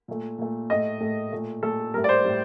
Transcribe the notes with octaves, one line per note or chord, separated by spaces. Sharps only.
A#2 A3
A#2 A3
A2 A3 D#5
A2 A3
A#2 A3
A#2 A3 A4
A2 G3 A#4
D5
C5
A2 G3